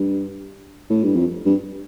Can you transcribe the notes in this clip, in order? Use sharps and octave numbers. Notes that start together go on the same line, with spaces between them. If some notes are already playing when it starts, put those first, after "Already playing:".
Already playing: G2
A2
G2
F2
G2